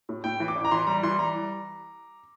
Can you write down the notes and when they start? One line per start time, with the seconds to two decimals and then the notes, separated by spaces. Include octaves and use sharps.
0.09 A2
0.24 A2 G5
0.40 E3
0.48 D6
0.55 A1
0.65 A#5
0.71 E3 C6
0.87 G3 A#5
1.03 E3 C6
1.19 G3 A#5